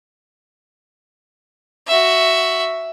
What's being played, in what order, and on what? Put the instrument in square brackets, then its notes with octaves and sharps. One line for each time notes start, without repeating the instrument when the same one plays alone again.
[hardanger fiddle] F#4 E5